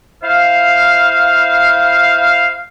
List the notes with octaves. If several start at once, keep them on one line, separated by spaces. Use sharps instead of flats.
E4 C5 F5